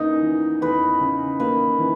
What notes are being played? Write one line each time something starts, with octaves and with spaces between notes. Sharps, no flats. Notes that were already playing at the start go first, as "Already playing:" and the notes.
Already playing: E2 C#3 A#3 D#4
E3
E2 B4
C#3
A#3 B4
E3